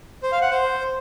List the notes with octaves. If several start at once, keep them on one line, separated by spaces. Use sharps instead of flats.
C5
F5
F#5
C5